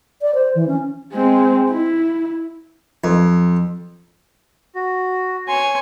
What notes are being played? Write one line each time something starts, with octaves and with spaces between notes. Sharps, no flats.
D5
C5
E3
C#4
G#3 C4
E4
F2
F#4
C#5 G#5 C6